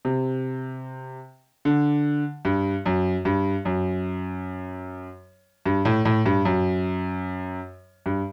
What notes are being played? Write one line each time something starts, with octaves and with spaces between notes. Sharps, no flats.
C3
D3
G2
F#2
G2
F#2
G2
A2
A2
G2
F#2
G2